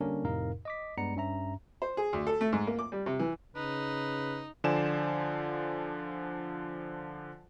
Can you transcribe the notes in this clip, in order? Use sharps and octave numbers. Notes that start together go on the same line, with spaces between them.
D3 G3 A#3 C#4 D4 A#4
F2 A2 C3 D#4 A#4 F5
D#5 D6 B6
G2 G#3 B3 D5 A#5 C#7
G2 C#4 E5 A#5
C5
G#4
D2
A4
A3
G#2
A#3
D6
G3
C3
E3
C#3 D#4 B4
D3 F3 C5 D5 G#5 E7